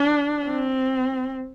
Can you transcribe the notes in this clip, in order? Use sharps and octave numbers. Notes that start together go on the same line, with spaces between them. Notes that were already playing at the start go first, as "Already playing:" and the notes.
Already playing: D4
C4